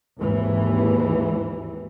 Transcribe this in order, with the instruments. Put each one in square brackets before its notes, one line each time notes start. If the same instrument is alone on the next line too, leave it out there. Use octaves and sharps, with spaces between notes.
[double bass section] G#1 D#2 G#2 E3